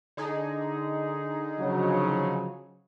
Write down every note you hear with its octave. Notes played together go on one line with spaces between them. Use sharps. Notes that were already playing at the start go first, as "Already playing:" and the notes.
D3 D#4 G#4
C#3 F3 F#3